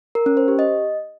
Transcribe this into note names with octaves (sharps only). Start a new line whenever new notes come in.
A#4
C#4
C5
G4
D#5